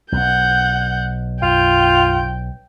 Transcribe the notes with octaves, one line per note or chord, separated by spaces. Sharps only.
B1 F#5 G6
F#2 F4 G5